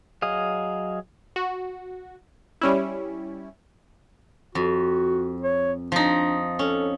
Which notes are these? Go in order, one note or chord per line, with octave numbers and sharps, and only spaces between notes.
F#3 G#4 D#5 F5
F#4
G3 C#4 E4
F2 F#4
C#5
F3 D4 D#4
C#4 A4